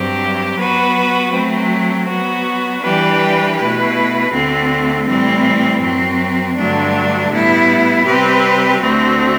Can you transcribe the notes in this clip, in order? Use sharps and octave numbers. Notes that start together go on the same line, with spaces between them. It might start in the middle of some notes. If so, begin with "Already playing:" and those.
Already playing: G2 F#3 C4 G4
F#3 B3 F#4 B4
F#3 A3 C4
F#3 B3 F#4
E3 G3 D4 G4 B4
B2 A3 E4 B4
D2 D3 A3 C4
A2 E3 G3 C4
F#2 F#3 C4
G2 D3 F#3 A3 D4
A2 G3 B3 E4
C3 G3 C4 G4 B4
D2 D3 A3 C4 F#4